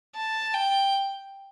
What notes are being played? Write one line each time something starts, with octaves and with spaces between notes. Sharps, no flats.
A5
G5